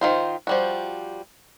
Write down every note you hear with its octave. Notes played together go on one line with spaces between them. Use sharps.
D#3 F4 C5
F3 G3 F#4